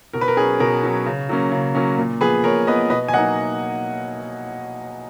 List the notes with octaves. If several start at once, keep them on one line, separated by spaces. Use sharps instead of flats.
B2 A#4
B4
A#4
F#3 C#4 G#4
B2 A#4
F#3 C#4
C#3
F#3 A#3 C#4
C#3
F#3 A#3 C#4
A#2
F3 B3 G#4 B4
A#2 A#4 C#5
F3 B3 B4 D#5
B2 B4 D#5
G#5
F#3 A#3 D#4 D#5 F#5